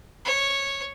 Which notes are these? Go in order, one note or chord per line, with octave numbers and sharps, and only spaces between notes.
C#5